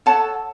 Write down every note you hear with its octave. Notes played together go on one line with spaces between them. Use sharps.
A4 C#5 F#5 A5